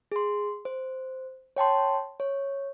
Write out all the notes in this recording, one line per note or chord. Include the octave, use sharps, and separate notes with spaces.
G#4 C6
C5
C#5 G5 A5 C6
C#5